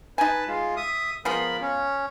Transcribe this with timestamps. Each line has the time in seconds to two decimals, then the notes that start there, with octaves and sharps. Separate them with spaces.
0.18 D#4 B4 G#5 A5
0.48 G#3 F4
0.77 E5 D#6
1.25 F3 G#3 B3 F4 A#4 B5
1.61 C#4